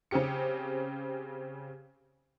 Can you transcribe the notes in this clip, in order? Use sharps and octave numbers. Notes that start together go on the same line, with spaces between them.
C#3 C4 C#4 G4 C#7